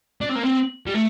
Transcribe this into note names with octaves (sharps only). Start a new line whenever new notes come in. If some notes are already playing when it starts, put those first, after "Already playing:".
D4
C4
A#3
C4
G3
A3